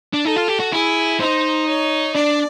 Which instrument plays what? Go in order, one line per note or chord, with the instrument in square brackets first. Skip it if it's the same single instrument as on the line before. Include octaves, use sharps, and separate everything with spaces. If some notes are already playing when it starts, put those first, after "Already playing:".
[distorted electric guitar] D4
[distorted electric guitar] D#4 [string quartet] A4
[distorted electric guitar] F4
G4
F#4
[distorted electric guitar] E4 [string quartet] G#4
[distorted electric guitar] D#4 [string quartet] C5
[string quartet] C#5
[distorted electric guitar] D4 [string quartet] D5